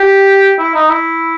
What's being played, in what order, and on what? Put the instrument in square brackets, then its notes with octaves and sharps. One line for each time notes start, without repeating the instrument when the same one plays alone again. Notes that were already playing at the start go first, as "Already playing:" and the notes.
Already playing: [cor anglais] G4
E4
D#4
E4